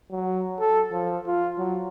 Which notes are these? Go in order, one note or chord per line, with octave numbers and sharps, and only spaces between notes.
F#3
A4
F3
F4
F#3